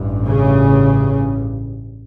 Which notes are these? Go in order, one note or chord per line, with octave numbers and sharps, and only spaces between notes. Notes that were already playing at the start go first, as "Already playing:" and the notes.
Already playing: A1 G2
C#3